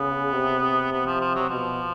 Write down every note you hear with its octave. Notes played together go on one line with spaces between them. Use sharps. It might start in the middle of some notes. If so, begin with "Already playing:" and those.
Already playing: C#3 B3
C3
B3
F3
F3
F#3
B2 F3